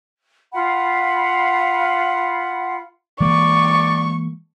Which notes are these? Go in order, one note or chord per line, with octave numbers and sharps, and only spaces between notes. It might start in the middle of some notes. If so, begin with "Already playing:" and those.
F4 F5 F#5 B5
E3 G#3 A#3 D5 C#6